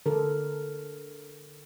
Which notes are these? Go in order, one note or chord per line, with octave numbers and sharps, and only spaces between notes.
D3 A4 A#4